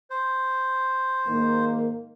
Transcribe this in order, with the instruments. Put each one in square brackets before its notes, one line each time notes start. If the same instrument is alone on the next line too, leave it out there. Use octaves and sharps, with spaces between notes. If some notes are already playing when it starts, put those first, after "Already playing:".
[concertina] C5
[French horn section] G#2 D#3 A#3